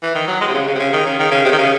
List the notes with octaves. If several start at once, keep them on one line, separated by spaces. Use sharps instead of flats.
E3
D#3
F#3
G#3
C3
C#3
C#3
C3
C#3
D#3
C#3
D#3
C#3
C3
D#3
C#3